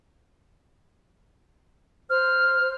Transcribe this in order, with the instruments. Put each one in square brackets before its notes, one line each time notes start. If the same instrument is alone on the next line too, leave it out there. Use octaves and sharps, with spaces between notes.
[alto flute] C5 [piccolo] F6